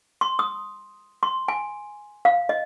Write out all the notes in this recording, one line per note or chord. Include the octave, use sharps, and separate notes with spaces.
C6
D#6
C6
G#5
F5
D#5